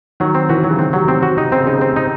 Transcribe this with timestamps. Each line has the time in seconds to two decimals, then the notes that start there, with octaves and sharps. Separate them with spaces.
0.20 D#3 F#3
0.35 C4
0.49 E3 F#4
0.64 F#3
0.70 C#3
0.79 D#3 C4
0.93 C3 F#3
1.08 C3 C4
1.23 F#4
1.37 C3 D#4
1.52 C#3 C4
1.66 C#3 D#4
1.81 C4
1.96 D#4